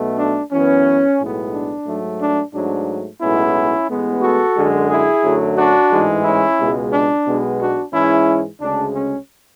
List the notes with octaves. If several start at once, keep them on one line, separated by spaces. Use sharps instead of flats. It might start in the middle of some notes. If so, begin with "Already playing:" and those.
Already playing: B1 B2 A3
D4
F#2 E3 B3 C#4
B1 A2 G#3 B3
D4
G#2 F#3 A3
D4
G#2 F#3 A3 D4
B1 A2 G#3 B3 C#4 E4
A1 A2 G#3 B3
F#4 A4
F#2 D3 G#3
E4 G#4
F#2 D3 F#3 A3
D4 F#4
A1 G#2 E3 G#3
C#4 E4
C#2 B2 G#3
D4
B1 B2 G#3 B3
D4 F#4
G#2 E3 G#3 C#4 E4
D2 C#3 G#3 D4
C#4